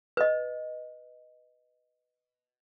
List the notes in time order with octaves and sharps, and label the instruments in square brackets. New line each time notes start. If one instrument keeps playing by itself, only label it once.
[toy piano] B4 D#5